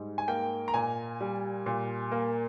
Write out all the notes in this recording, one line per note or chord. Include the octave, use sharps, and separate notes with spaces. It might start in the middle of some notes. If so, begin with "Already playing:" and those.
Already playing: G#2 G3
G#5
A#3 G5
A#5
A#2 G#5
G3
A#2
A#3